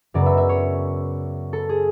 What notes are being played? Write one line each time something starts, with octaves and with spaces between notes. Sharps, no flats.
F#2 C#3 F#3 B3 D5
E5
E5
C#5
A4
G#4